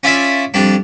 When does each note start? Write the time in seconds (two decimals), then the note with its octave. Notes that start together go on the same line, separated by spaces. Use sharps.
0.04 C#4 F4 D5 E5
0.54 F2 G3 D4